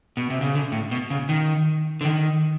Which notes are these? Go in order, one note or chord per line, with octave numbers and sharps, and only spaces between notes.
B2
C3
C#3
D3
A2
B2
C#3
D#3
D3
D#3